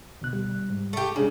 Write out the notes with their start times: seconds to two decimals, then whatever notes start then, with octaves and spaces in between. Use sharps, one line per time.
0.22 D2 B2 F#6
0.33 G3
0.70 G#2
0.93 A3 G4
1.16 C#3 G#3 C#4 D4